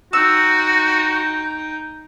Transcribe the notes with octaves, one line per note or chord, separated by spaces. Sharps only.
D#4 F#4 G5 E6